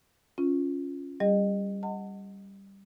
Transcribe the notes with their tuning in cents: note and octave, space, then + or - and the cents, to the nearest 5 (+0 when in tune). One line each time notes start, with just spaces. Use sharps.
C#4 +5 F4 +0
G3 +0 G#4 -45 D#5 -25
D#5 +0 F#5 +0 A5 +35